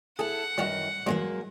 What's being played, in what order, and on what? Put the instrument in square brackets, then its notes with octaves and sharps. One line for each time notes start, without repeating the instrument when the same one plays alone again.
[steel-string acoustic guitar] E4 A4 [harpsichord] G#4 [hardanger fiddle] F#5
[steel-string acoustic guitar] F#2 D#3 E3 [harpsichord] G3 F#4
[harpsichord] E2 G2 [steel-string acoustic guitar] F#3 G#3 A#3